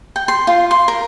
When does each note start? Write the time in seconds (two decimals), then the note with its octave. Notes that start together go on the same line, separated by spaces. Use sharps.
0.16 G5
0.28 C6
0.47 F4
0.71 C6
0.88 A#4